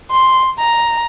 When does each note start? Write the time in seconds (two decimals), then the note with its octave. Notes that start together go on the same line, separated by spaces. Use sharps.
0.11 C6
0.59 A#5